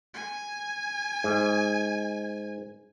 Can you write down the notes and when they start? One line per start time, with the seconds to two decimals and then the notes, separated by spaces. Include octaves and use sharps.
0.14 G#5
1.24 G#2